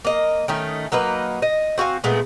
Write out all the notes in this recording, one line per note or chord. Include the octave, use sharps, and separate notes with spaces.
A#3 D#5
D#3 A3 C#4 D#4
F#3 A#3 D#4 B4
D#5
C4 F#4 F5 G#5
A#2 G#3 A3 B3